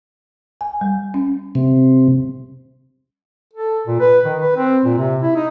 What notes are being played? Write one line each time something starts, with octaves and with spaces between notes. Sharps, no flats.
G#5
G3
C#4
C3
A4
A#2
B4
D#3
B4
C4
A#2
C3
E4
D#4